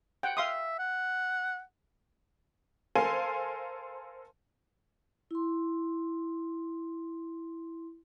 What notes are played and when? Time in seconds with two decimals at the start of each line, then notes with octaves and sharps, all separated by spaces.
0.23 F#5 G5
0.37 E5 F5 C6 D#6
0.79 F#5
2.95 A4 A#4 C5 F5 G#5 C6
5.31 E4 C6